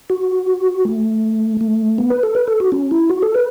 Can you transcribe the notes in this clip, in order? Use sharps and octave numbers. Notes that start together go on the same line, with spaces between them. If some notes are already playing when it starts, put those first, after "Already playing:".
F#4
A3
A3
B3
B4
A4
B4
A4
F#4
C#4
E4
F#4
A4
B4